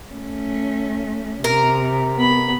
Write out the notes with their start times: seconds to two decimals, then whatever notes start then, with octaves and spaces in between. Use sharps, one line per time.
0.11 A3 C#4
1.44 C3 A#4
2.16 B3 B5